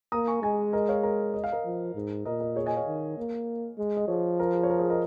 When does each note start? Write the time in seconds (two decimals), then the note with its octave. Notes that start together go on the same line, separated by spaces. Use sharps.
0.12 A#3 A#5 D#6
0.27 G#5 C#6
0.42 G#3 D#5 G#5
0.73 A#4 D#5
0.89 C#5 F5
1.03 A#4
1.34 D#5
1.44 F5
1.52 A#4 D#5
1.65 F3
1.95 G#2
2.25 A#2 A#4 D#5
2.41 A#4 D#5
2.56 G#4 C#5
2.66 D#5 G#5
2.76 C#5 F5
2.86 D#3
3.18 A#3
3.78 G#3
3.97 D#5
4.08 F3 G#4 C#5
4.40 A#4
4.54 G#4
4.63 C#5
4.69 A#4
4.79 G#4 C#5
4.90 A#4 D#5